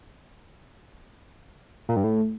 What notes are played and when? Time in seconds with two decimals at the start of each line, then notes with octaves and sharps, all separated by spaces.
1.89 A#2
1.96 G2
2.04 A2